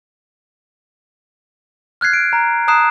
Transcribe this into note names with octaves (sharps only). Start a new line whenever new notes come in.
F6 F#6 G#6 C7
D7
A#5
A5 A#5 D#6 F#6 C7 E7